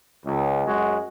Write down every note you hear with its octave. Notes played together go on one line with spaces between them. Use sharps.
C#2
F#2 G#3 F#4